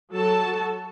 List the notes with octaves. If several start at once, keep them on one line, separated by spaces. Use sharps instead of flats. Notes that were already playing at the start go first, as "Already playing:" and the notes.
F#3 F#4 A4 A5